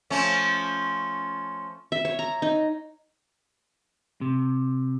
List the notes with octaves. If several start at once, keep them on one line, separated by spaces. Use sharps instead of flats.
F3 A3 C#4
E5
C#5
A#5
D#4
C3